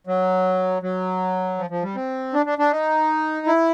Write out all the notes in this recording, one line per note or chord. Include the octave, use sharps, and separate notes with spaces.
F#3
F#3
F3
F3
G3
C4
D4
D4
D4
D#4
E4